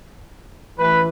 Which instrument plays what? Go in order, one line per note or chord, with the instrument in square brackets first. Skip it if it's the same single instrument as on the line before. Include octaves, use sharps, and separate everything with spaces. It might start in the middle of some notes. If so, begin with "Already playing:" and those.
[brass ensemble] A1 E3 [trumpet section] B4